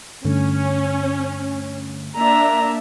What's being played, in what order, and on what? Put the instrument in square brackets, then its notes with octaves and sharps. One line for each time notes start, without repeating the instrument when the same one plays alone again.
[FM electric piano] G2 D3 A3 [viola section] C#4
[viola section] A#3 D4 E5 [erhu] A#5